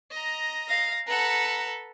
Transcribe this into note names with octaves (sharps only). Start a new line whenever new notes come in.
D#5 A#5
F5 A#6
A4 B4 F#5 A#5